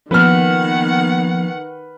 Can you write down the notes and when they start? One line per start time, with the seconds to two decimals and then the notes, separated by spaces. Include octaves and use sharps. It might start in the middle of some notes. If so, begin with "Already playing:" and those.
0.11 D#3 F3 A#3 B3 B4 F#5 F6